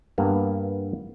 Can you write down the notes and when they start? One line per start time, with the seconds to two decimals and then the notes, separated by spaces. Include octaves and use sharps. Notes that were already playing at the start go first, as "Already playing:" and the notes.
0.18 G2 A#3 B3